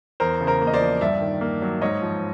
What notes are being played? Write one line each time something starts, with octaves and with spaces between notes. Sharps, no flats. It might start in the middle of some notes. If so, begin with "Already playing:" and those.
E2 A#4 C5
C#3
A#4 C5
A#3
D#5
C5 D5
F3
G2 D5 E5
D#3
A#3
F#3
G#2 C#5 D#5
F3